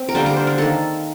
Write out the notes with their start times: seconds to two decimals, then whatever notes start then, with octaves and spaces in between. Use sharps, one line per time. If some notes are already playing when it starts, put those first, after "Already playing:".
Already playing: C4
0.09 A#4
0.15 D3 G3 A#3 C5
0.26 A#4
0.37 C5
0.47 A#4
0.58 D#3 A#3 A4